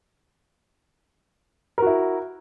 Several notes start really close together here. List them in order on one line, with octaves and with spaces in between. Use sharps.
A#4 F#4 E4